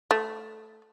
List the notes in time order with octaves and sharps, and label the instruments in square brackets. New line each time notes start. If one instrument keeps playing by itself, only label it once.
[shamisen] A3